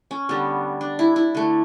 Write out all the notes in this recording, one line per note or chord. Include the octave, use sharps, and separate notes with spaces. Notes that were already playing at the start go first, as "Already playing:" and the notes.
C#4
D3 G3 B3
D4
E4
E4
D3 A3